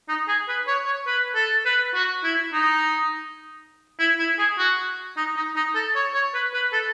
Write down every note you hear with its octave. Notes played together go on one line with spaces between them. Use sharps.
D#4
G#4
B4
C#5
C#5
B4
A4
B4
F#4
E4
D#4
E4
E4
G#4
F#4
D#4
D#4
D#4
A4
C#5
C#5
B4
B4
A4